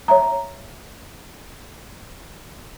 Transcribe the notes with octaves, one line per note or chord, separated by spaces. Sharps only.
C#5 E5 A#5